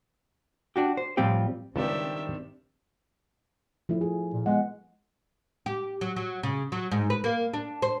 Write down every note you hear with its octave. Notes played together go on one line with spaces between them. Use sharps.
D4 F#4 G4
C5
A2 F3 G3 C4 F4 G4
C#2 D#3 G3 C4 D4 G4 E5
F3 A3 E4
E4 G#4
A#2
G#3 B3 D#5 F#5
G4
F#3
F#3
C#3
F#3
G#2
B4
A#3
D4
C5